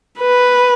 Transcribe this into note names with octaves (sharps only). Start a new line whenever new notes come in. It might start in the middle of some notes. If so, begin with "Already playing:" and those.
B4